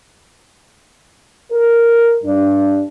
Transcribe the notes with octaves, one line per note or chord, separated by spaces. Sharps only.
A#4
G2 D4